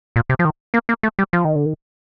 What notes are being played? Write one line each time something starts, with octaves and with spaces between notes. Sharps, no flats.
A#2
C3
F3
D#3
A#3
A#3
A3
G3
F3
D#3
D3
D#3